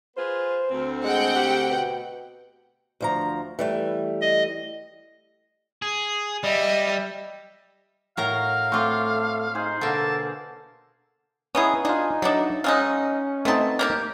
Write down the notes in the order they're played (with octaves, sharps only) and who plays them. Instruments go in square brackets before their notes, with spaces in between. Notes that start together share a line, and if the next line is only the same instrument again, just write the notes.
[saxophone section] F4 G#4 B4 [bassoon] C5
[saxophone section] D2 C4
[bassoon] G#3 [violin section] F#5 G5
[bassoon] G4
B2
[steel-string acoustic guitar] D2 F3 A#5
E3 G3 A3
[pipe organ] D#5
[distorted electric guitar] G#4
[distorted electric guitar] G3 [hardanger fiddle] D#5 E5
[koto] A2 A#4 A#5 [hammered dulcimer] F#3 [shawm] F5
[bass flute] A3 [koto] C4 F4 [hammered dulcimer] C#6 D6
[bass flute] D#4 [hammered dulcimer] G#4 C5
[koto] B2 D3 A#3 [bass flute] A4 [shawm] A5
[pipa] B3 D#4 G#4 [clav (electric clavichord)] C#4 E4
[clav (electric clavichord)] D4 F4 [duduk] D#4 [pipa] G#4
[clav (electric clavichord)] F#3 D#5 [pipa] D4 E4 A4
[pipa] F#3 G#3 D#4 [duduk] C#4 [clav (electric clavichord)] F5
[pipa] B2 A5 [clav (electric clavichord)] A3 C4 D#4
[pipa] A#3 E4 G4